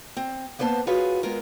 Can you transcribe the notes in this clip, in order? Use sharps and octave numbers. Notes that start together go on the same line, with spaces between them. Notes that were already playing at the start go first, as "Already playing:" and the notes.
C4
A#3 B3 B4 C5 G#5 A5
F4 F#4 G#4 B4 C#5 F5
G#3 B3 F4 A#4